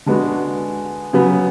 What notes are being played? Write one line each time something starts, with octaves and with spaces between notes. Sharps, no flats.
D3 G#3 B3 F#4
C#3 F#3 B3